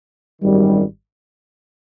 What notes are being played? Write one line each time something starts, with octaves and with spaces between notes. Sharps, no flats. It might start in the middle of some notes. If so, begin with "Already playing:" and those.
G#1 F#2 D#3 G3